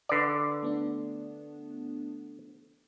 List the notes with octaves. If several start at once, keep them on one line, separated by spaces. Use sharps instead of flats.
D3 B4 D5 D6
A3 B3 D4